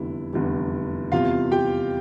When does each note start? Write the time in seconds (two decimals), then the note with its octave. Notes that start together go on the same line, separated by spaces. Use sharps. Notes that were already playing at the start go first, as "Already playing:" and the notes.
Already playing: F1 E2 D3 G3 E4
0.33 F1 E2 D3 G3
1.12 E2 C3 G3 F4 F5
1.51 G4 G5